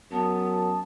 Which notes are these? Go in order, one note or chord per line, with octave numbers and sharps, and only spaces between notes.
F#2 B3 A5